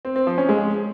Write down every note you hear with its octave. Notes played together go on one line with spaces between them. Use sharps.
C4
C4
F3
C#4
G#3